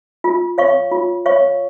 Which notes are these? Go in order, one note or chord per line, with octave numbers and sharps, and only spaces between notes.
F4
C#5 F5 C#6
F4
C#5 F5 C#6